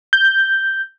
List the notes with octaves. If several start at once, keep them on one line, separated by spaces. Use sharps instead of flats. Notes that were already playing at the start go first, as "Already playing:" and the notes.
G6